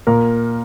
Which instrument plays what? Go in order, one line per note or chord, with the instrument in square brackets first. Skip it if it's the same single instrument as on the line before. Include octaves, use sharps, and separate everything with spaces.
[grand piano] A#2 A#4